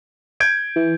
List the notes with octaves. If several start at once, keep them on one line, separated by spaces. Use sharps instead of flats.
G6 G#6 D7
E3